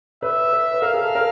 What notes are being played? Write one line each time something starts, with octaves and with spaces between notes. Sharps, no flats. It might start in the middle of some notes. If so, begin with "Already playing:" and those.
B4 E5
B4
B4
A#4 F5
G#4
A4
A#4